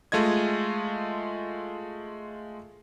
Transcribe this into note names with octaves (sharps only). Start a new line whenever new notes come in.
G#3 A3 F4 D#5 G#6